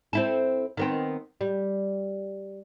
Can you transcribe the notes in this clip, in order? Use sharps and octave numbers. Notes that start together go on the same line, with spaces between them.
C4 E4 A4
D#3 B3 C4
G3